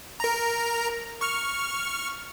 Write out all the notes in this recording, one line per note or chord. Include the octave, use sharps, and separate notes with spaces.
A#4 A#5
C#6 F6